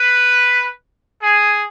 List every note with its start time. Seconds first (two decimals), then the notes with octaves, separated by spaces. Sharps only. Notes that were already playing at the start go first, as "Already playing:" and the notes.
Already playing: B4
1.21 G#4